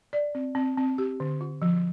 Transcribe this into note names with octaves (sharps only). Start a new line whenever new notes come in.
D5
C4
C4
C4
G4
D3
F4
F3